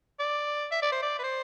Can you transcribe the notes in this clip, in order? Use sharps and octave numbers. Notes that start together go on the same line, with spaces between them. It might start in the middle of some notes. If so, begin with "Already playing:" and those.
D5
E5
D5
C5
D5
B4
C5